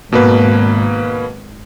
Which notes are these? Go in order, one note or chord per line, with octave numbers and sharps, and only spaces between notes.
G#1 B2 A#3 B4